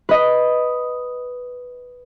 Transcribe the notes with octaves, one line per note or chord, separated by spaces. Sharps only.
B4 D#5